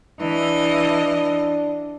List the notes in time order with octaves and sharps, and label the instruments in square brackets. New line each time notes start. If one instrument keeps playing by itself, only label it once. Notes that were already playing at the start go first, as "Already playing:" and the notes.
[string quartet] E3 D#5 [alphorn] D4